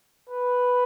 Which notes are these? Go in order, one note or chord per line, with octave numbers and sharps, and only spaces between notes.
B4